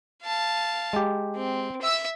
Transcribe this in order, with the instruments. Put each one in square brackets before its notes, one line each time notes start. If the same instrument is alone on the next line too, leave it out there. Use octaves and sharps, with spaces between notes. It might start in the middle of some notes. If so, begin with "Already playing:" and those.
[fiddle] F5 A5
[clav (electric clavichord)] G#3 G4
[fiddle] C4
E5 E6